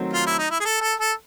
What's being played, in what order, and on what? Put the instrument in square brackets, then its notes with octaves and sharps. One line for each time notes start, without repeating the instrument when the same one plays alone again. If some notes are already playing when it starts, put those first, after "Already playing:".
Already playing: [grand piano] D#3 F#3 A3 C4
[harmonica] F4
E4
D#4
E4
G#4
A4
A4
A4